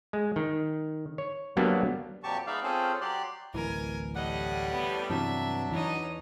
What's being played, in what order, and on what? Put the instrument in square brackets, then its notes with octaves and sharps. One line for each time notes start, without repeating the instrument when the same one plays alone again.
[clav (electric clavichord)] G#3
D#3
C#5
F#3 G3 A#3 B3 D4
[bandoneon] F2 A#2 F#3 G4 A5 C#6
G#3 B3 D#4 D5 E5 F5
C4 C#4 F4 G#4 A4 C5
F#3 G4 D5 C6 F#6
[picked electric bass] D1 A1 E3 [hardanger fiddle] A#4 G#5
[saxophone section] A2 G3 [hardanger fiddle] D#5 [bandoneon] F#5
[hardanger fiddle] B3
[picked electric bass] G2 C3 E3 [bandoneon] F#3 D4 [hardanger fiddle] E5
[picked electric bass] E2 E3 [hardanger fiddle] C#4 D#4